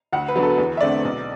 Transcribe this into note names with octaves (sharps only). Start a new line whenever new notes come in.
D2 F#5
B4
D3 F#3 B3
A4
E2
E5
D3 A3 C4 D5
B1